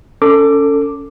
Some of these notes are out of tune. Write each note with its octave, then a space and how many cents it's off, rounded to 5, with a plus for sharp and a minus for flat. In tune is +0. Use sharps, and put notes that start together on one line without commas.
C#4 +20 A4 +25 D6 +0